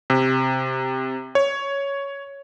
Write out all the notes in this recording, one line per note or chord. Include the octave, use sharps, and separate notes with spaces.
C3
C#5